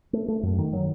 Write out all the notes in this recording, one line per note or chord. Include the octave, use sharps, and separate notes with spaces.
A3
A3
F#2
D#3
F#3